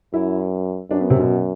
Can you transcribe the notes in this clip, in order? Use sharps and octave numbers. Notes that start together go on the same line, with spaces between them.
F#2 E4
F#2 D4
B3
C3
B2